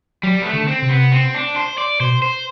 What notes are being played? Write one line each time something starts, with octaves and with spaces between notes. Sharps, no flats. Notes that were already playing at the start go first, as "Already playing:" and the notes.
F#3 G3
B3
A3
D3
C4
C3
B3
C4
D4
C5
D5
B2 C5
C5